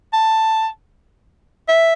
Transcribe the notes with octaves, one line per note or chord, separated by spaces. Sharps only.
A5
E5